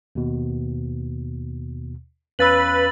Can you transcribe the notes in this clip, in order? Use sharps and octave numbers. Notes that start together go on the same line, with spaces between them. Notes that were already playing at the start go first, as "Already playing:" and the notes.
D#2 B2
E2 C#4 B4 F5 E6 A6 F#7